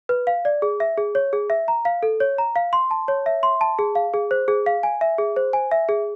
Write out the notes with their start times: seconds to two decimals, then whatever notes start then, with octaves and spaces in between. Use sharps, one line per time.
0.09 B4
0.27 F5
0.45 D5
0.62 G#4
0.80 E5
0.98 G#4
1.15 C#5
1.33 G#4
1.50 E5
1.68 A#5
1.85 F5
2.03 A4
2.20 C#5
2.38 A#5
2.56 F5
2.73 C6
2.91 A5
3.08 C#5
3.26 E5
3.43 C6
3.61 A5
3.79 G#4
3.95 F5
4.14 G#4
4.31 C5
4.48 G#4
4.66 F5
4.83 G#5
5.01 E5
5.18 G#4
5.36 C5
5.53 G#5
5.72 E5
5.89 G#4